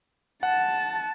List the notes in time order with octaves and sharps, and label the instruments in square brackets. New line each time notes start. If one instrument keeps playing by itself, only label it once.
[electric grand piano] F#5 [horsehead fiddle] A5